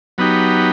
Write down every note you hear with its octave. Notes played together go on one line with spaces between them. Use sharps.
F#3 B3 D#4 G4